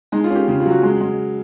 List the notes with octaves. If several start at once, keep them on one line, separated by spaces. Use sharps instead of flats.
G#3 D#4
F4
C#4
G4
C#3 F4
F4
F#3
F#4
G#3
G#3